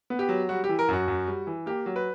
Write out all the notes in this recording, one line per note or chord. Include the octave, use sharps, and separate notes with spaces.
B3
G4
F#3
G3 F#4
G4
E3
A#4
F#2 F#4
F#2
G3
E3
A#3 G4
F#3
B4